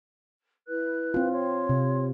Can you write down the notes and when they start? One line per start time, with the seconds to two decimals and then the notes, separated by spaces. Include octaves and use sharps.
0.68 E4 B4 F#6
1.14 C4 F4
1.32 C#5 C6
1.69 C3